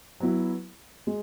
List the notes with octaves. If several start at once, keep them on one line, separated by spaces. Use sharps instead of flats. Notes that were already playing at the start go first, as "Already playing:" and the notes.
F#3 B3 E4
G#3